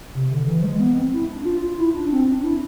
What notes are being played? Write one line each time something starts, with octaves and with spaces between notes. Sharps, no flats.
C3
D3
E3
F3
G#3
B3
C4
E4
D4
F4
F4
E4
D4
C4
D4
E4